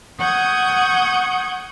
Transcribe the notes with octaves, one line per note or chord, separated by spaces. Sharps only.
F#5 C#6 D#6 G6 G#6